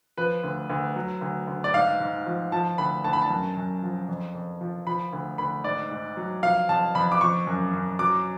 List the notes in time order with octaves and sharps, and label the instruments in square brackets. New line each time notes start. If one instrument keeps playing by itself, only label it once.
[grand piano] F3 B4
D2
D2
F#3
D2
D2
D5
G#2 F5
G#2
F3
F3 A5
D2 B5
D2 A5
B5
A5
F#2
F#2
F3
F2
F2
F3
F3 B5
D2
D2 B5
G#2 D5
G#2
F#3
F3 F5
F2 A5
F2 B5
D6
F3 C#6
F#2
F#2
F#3 D6